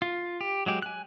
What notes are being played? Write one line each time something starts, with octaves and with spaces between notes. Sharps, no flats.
F4
G4
F#3 G#3 G4
G#5 F#6